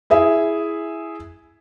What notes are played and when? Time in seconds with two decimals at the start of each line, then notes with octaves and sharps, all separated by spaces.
0.10 E4 G#4 E5